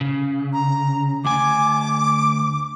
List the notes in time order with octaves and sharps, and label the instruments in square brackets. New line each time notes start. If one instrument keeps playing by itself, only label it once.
[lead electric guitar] C#3
[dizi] A#5
[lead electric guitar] D2 G#5 [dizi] D6